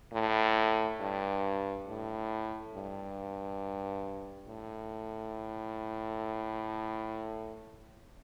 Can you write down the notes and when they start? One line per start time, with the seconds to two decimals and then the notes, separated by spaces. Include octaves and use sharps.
0.13 A2
1.00 G2
1.87 A2
2.74 G2
4.48 A2